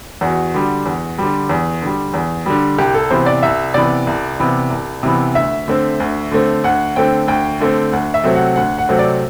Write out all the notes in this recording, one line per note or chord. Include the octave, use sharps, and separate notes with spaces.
E2 F#4
D3 G3
E2
D3 G3
E2
D3 G3
E2
D3 G3
C2 G4
A4
C3 E3 B3 C5
D5
C2 E5
C3 E3 B3 D5
C2
C3 E3 B3
C2
C3 E3 B3
D2 E5
D3 A3 C4
D2
D3 A3 C4
D2 F#5
D3 A3 C4 G5
D2 G5
D3 A3 C4
D2 F#5
E5
C3 F#3 A3 C4
F#5
D2 F#5
F#5
C3 F#3 A3 C4
D5